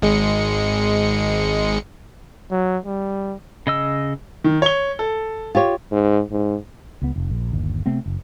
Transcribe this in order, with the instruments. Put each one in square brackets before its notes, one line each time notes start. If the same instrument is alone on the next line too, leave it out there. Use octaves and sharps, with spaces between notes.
[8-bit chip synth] G#1 G#3 C#7
[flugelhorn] F#3
G3
[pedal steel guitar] C#3 D#5 E6
[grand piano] D#3
C#5 G7
A4
[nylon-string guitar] F4 G4 C#5
[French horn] G#2
G#2
[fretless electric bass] C#2 B3
F1
A#1
G1 D#2
C3 A3 B3 C4
F#1